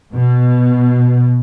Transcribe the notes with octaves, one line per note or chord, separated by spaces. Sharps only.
B2